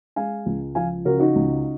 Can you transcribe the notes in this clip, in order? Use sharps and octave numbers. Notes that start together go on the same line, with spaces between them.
G#3 F5 G#5
C#2
F3 F5 G#5
C#3 F#4 A#4
D#4 F#4
C#2